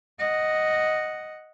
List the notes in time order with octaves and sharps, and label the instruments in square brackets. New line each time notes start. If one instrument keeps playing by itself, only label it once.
[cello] D#5 F#5